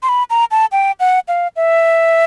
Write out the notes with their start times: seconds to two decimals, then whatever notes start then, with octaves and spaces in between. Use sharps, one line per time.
0.03 C6
0.09 B5
0.30 A#5
0.51 A5
0.72 G5
1.00 F#5
1.28 F5
1.56 E5